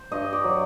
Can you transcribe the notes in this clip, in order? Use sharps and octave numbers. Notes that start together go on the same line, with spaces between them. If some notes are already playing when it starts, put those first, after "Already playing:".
Already playing: C5
G2 D#5
D5
F#3